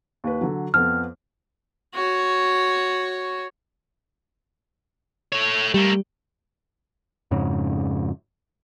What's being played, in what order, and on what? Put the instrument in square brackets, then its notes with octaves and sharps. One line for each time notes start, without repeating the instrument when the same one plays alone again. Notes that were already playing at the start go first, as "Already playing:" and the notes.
[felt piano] D#2 B4
D3 F#3
[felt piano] F2 B3 [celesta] F6
[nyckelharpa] F#4 C#5
[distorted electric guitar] A3 C#5
[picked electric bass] G3 [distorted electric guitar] A3 A#3
[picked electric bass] F2 G#2 C#3